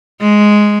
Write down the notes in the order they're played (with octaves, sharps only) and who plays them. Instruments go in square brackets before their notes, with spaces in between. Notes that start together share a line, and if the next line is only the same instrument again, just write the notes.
[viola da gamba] G#3